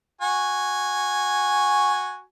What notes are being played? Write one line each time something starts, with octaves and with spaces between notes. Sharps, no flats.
F#4 G#5